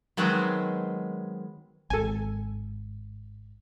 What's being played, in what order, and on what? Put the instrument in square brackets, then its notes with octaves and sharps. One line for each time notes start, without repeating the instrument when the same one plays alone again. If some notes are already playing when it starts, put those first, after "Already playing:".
[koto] D#3 F#3 G#3 B3 C4 C5
[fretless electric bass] G#1 [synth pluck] A4 G#5